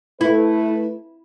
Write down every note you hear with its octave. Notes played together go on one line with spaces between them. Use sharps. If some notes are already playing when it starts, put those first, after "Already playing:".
A3 E4 B4